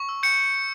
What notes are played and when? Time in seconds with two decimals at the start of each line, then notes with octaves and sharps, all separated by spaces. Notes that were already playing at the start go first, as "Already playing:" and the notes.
Already playing: C#6
0.09 E6
0.23 G6 C#7